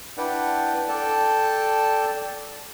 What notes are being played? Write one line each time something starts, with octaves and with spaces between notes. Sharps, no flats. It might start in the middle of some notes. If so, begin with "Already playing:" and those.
D4 E4 B4 D5 F#5 G5
A4 D5 G5 A5